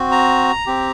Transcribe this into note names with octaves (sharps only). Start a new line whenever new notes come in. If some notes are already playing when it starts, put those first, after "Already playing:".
Already playing: C4 F#4
A#5
C4 G4